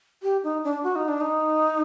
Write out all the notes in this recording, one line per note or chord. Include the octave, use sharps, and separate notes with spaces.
G4
D#4
D4
F#4
D#4
D4
D#4